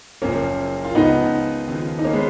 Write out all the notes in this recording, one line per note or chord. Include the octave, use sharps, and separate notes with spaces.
F#1 F#2 C#3 F3 A#3 C#4
F4
C#2 C#3 F3 B3 D#4
D#2 C#3 F3
D#4
A#3 C#4
G#3 B3